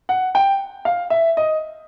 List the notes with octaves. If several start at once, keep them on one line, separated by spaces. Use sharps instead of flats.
F#5
G5
F5
E5
D#5